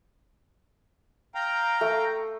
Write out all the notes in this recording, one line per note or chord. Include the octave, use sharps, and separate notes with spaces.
F5 G5 A#5
A3